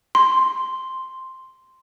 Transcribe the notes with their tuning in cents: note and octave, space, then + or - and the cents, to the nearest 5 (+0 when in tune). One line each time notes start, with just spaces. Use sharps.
C6 +0